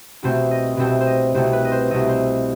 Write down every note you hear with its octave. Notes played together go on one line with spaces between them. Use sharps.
C2 B2 A3 C4 C5
D#5
C2 B2 A3 C4 C5
C5
D#5
C2 B2 A3 C4 C5
B4
D#5
C5
C2 B2 A3 C4 D#5
C5